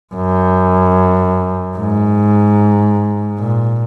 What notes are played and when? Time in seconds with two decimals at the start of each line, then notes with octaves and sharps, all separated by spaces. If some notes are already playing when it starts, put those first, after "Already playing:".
0.15 F#2
1.77 G#2
3.39 A#2